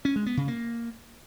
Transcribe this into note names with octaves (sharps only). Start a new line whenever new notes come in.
C#4
G#3
B3
C#3
A#3